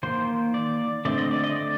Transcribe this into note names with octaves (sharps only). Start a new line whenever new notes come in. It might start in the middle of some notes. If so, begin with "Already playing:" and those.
D#3 A#3 C5
D5
D3 A3 C4 D5
D#5
D5
D#5
D5